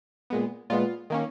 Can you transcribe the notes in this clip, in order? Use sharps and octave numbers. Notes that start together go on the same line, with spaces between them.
A#2 G#3 B3
A#2 G#3 B3 F4
D#3 A#3 C#4